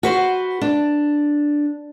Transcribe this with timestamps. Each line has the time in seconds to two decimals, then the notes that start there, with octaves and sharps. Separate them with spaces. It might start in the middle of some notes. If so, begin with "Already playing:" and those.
0.03 F#4 B4 C5
0.61 D4